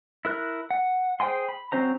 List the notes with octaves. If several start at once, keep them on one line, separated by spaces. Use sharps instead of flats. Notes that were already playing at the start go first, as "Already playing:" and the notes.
E4 A#4 F#6
F#5
G#4 C5 G5 G#5 C6
B5
F#3 C4 C#4 C5 A#5